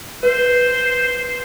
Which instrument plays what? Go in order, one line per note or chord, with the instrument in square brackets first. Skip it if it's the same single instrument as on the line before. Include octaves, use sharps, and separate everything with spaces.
[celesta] B4 [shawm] C5